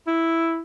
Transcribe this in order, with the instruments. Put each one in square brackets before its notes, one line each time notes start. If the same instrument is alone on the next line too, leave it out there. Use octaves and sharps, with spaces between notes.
[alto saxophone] E4